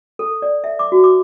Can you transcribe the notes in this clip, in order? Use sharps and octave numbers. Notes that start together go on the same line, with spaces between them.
A4
D5
E5
D6
F#4
D6